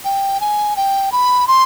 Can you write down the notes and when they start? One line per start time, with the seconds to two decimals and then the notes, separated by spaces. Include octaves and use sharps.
0.05 G5
0.40 G#5
0.77 G5
1.12 B5
1.48 C6